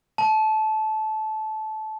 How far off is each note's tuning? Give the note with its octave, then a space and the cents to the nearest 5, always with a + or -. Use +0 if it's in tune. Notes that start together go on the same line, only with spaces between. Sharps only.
A5 -20